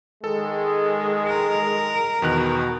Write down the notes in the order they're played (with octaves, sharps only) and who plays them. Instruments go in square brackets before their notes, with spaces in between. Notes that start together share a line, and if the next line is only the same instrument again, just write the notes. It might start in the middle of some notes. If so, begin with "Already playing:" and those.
[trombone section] D#3 G#3 [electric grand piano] A4
[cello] A#4
[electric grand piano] E2 D#3 F#6 [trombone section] B2